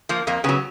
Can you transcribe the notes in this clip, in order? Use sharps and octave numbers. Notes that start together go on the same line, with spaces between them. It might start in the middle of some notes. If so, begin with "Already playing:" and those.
F3 A#3
F2 A#3
C#3 F#3 B3